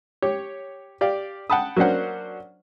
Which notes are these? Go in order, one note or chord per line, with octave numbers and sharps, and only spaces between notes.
G4 C#5
G4 D5 F5
F#5 G5 A5 B5 D#6
F#3 A#3 C#4 D4 C5 F#5